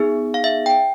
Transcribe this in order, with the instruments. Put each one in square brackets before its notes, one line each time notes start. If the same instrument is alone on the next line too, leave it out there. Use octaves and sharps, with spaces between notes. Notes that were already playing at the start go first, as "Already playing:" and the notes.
Already playing: [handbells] B3 D#4 G#4
F5
E5
G5